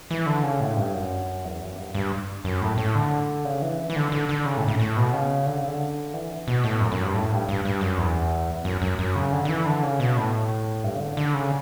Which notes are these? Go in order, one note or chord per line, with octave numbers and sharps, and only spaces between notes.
E3
D3
C#3
A2
G2
F#2
E2
F#2
G2
G2
F#2
A2
A2
D3
C#3
E3
E3
D3
D3
D3
C#3
A2
A2
A2
B2
C#3
D3
C#3
D3
E3
B2
A2
F#2
F#2
G2
A2
G2
G2
G2
F#2
E2
F#2
F#2
F#2
C#3
D3
D3
E3
D3
C#3
B2
A2
G2
C#3
D3
D3
C#3